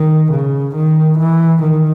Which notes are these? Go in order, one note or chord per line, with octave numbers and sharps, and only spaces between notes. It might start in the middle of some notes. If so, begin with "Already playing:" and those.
Already playing: D#3
C#3
D#3
E3
D#3